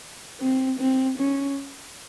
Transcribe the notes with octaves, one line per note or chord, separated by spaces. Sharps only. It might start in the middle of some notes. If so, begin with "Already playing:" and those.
C4
C4
C#4